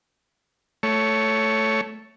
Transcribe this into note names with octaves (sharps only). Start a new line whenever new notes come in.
A3 C#5